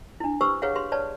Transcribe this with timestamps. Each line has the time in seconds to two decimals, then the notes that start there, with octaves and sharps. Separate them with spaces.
0.20 D4 E4
0.41 G4 B4 C5 C#6 E6
0.62 G#4 B4 C#5 F5 F#5
0.75 G4 B4 C6
0.92 B4 C#5 D5 A5